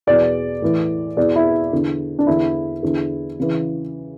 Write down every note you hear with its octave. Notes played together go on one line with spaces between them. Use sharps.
E2 B2 D5
A2 E3
E2 B2 D5
E4
E2 D3
D4
E2 D3 E4
E2 D3
C#3 E3